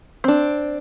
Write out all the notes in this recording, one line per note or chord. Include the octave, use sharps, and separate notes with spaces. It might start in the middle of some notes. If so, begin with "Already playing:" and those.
C4 D4